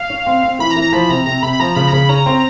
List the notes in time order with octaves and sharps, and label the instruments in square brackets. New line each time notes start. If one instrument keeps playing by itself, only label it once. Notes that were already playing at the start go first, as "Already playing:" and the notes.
Already playing: [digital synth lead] F5
[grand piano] C#4
C4
C4
[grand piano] E3 [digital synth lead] B5
[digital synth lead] A#5
[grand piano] E3
[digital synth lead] A#5
[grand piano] F3 [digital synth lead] B5
[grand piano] C3 [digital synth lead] A#5
[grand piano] C3 [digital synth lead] A#5
[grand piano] C3 [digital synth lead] B5
[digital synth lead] B5
[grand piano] F3 [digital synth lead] A#5
[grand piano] C#3 [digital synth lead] B5
[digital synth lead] A#5
[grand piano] C#3 [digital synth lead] B5
[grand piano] C#4 [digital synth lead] A#5
[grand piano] C4